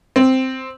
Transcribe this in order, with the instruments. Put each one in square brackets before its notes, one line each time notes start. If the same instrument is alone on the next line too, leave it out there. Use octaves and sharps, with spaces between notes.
[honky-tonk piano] C4